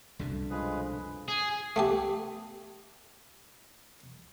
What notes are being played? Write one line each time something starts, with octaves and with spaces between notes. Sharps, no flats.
C2 F#2 B2 D3
F3 G#3 G#4 B4
G#4
A3 B3 G4